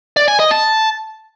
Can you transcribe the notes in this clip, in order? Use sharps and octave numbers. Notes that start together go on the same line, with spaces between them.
D5
G#5
D#5
A5